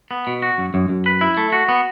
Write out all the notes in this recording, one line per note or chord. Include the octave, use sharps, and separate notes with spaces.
B3
B2
F#4
F#2
F#2
F#2
B4
E4
A3
F#4
B3